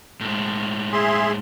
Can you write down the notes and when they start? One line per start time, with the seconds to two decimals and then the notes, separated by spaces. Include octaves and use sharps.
0.21 A2 G#3
0.92 G#4 E5 C6